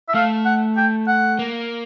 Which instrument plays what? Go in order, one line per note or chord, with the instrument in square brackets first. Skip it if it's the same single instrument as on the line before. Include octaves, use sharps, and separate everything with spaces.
[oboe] E5
[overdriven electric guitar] A3 [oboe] F5
[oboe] F#5
G5
F#5
[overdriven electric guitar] A#3